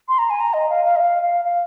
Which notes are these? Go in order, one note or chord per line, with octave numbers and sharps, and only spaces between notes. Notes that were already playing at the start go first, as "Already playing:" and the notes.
C6
A#5
G#5
A#5
D#5
F5
F5
D#5
F5
F5
F5